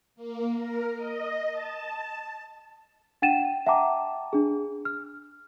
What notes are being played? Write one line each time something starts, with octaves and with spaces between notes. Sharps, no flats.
A#3
A#4
D#5
A5
D4 F#5 G5 A6 D#7 E7
E5 F#5 G5 A5 A#5 D6
D4 G#4
F6